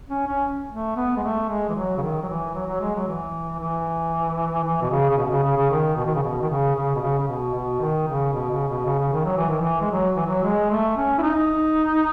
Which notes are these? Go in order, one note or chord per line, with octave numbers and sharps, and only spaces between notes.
C#4
C#4
A3
B3
G#3
A3
G#3
E3
F#3
C#3
D#3
F#3
E3
F#3
F#3
G#3
F#3
E3
E3
E3
B2
C#3
C#3
B2
C#3
C#3
C#3
D#3
B2
D#3
C#3
B2
D#3
C#3
C#3
B2
C#3
C#3
B2
B2
D#3
C#3
B2
C#3
B2
C#3
C#3
D#3
F#3
E3
D#3
E3
G#3
F#3
E3
F#3
G#3
A3
C#4
E4
D#4